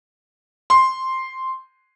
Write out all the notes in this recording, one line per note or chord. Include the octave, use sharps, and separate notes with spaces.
C6